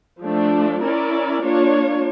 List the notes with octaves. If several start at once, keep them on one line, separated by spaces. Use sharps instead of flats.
F3 A3 D4
C#4 E4 A#4 D5
A#3 D4 F4 C#5